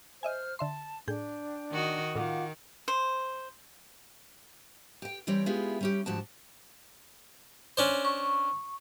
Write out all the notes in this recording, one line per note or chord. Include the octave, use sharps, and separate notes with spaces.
C5 D#5 E5 G#5 F6
D3 E5 A5 C6
A2 D4 G#4 G5 G6
D#3 F#4 D#5
A2 D#3 F4 F#5 D6
C5
G4 G5
E3 G3 C4 G4 C#5
G#3 B3 E4 F4 G4 G#4
G3 C#4 G4
D2 G#2 F3 F#4 G4 A5
C#4 D4 C5
C#6